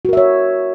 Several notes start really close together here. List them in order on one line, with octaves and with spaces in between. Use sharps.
F#4 A#4 E5 C#5